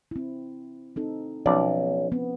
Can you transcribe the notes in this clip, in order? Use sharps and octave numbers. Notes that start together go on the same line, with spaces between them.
C4 E4
C4 D#4 A4
B1 F3 C#4 D5
B3 C4